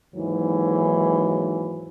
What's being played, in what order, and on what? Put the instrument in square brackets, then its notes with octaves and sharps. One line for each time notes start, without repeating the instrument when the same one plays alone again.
[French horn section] D#2 G#2 E3 F#3